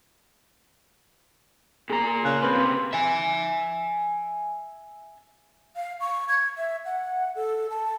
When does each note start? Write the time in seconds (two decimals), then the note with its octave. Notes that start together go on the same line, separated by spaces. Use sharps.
1.90 A#2 G#4 A#5
2.25 C#3 F#6
2.43 A#3 C4 B4 C6
2.55 C3
2.93 E5 G#5
5.76 F5
6.01 C#6
6.28 G#6
6.58 E5
6.85 F#5
7.35 A4
7.70 A5